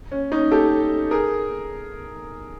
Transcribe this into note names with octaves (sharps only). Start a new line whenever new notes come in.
C#4
C#4 D#4
G4 A4
G#4 A#4